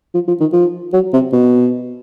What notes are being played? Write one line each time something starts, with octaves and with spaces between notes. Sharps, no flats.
F3
F3
D#3
F3
F#3
C3
B2